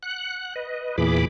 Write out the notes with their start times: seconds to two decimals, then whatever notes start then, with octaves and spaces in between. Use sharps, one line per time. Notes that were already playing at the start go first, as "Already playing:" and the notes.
0.03 F#5 F#6
0.56 B4 D#5
0.98 E2 A#2 E3 G#4 B5 D6